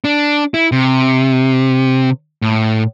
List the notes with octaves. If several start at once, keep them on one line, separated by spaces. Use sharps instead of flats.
D4
E4
C3
A2